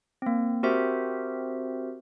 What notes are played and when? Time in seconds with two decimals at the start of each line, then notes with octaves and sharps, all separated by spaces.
0.22 A#3 C4
0.63 C4 F#4 G4 A#4 C5 E5